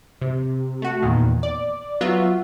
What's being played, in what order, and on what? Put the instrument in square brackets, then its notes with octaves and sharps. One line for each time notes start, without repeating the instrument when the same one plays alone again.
[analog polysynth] C3
A3 F#4
E2 A#2 D#3
D5
F#3 B3 F4 F#4 E5